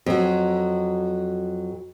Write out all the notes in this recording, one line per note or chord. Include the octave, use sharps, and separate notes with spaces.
F2 F#3